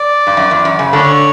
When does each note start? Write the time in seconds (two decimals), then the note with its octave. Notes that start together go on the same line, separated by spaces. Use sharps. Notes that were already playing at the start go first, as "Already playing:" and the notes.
Already playing: D5
0.27 G2
0.37 F#2
0.51 E2
0.65 F#2
0.79 C#3
0.93 D3 A4 C#5